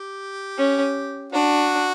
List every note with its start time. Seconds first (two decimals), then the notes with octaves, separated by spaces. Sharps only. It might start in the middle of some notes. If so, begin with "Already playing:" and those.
Already playing: G4
0.58 C#4
1.32 D4 F#4